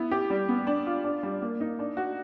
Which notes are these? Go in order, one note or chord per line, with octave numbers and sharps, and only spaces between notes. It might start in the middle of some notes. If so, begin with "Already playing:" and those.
Already playing: B3 E4
G4
G3
B3
D4
F4
D4
G3
A#3
D#4
D4
F#4